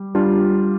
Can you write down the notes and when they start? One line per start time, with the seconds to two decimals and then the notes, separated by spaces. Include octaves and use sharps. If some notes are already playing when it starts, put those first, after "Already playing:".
Already playing: G3
0.15 G3 D4 F4